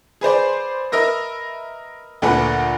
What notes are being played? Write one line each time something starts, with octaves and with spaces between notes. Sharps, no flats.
G#4 B4 C5 D5
A#4 B4 D#5 E5 E6 A#6
D2 A#2 D3 A4 B4 F#5